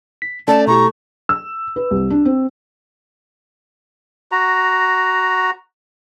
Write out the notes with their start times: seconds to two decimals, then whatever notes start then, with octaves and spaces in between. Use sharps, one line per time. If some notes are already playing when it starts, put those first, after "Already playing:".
0.22 B6
0.48 A3 C#4 D5 A5
0.67 B2 E4 G4 A#5 C#6
1.29 E6
1.76 B4
1.91 C2
2.10 D4
2.25 C4
4.32 F#4 A#5